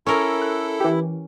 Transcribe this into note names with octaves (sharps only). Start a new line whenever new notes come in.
C#4 E4 A4 A#4
F#6
E3 G4